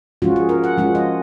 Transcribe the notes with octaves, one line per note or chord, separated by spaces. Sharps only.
F3 G#3 C#4 F4 F#4
G#4
A#4
F#5
F3 G#3 C#4 F4
D#5